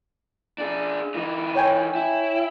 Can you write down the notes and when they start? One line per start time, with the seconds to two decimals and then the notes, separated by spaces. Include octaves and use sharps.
0.58 D4 G#4
1.15 E3 D#4
1.56 C#5 G5 G#5
1.95 E4